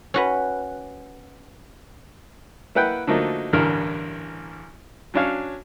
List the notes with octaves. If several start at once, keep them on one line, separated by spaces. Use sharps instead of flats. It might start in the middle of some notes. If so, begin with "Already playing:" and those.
C#4 F#4 B4
A#3 E4 B4 F#5 G5
D3 F3 F#3 A3 A#3 D#4
A1 E2 G2 D3 A#4 F6
F#3 C#4 D4 C#5 F5 C#6